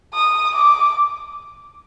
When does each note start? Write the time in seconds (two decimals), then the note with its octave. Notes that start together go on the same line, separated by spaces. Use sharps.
0.14 D#6
0.56 D6